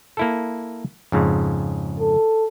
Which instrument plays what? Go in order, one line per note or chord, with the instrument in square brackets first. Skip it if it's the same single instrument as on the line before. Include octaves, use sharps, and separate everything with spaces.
[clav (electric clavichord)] A#3 E4 A4
F2 G#2 C#3
[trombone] A4